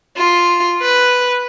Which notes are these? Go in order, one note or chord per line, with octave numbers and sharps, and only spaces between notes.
F4
B4